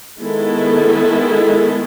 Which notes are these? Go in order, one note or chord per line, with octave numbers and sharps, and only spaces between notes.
D#3 G#3 B3 E4 A4